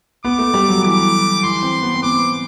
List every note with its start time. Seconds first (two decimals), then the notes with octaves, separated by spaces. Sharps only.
0.25 B3 D6
0.39 A3
0.54 G3
0.69 F#3
0.84 E3 D6
1.43 E3 C6
1.63 C4
1.82 B3
1.95 C4
2.02 B3 D6